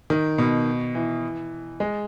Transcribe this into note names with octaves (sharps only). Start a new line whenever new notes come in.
D#3
B2
E3
G#3